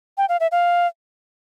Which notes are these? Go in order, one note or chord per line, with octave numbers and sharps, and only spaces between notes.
G5
F5
E5
F5